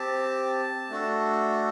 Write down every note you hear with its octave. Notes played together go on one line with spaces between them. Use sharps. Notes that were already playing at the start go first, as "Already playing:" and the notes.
Already playing: C4 G4 A5
A3 D4 F#4 A4